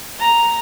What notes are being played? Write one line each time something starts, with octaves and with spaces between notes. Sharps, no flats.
A#5